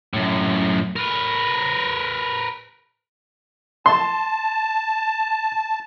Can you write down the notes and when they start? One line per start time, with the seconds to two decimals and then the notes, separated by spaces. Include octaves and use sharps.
0.14 F#2 A2
0.96 A#4 B4
3.86 A5 C6